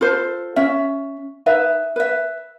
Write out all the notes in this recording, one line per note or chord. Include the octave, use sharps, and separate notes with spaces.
F4 A4 C5
C#4 E5
D#4 B4 E5
B4 E5